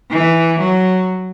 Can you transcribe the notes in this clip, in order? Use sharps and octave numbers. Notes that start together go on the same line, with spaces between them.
E3
F#3